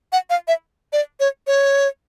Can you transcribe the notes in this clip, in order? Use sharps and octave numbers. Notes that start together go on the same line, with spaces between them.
F#5
F5
E5
D5
C#5
C#5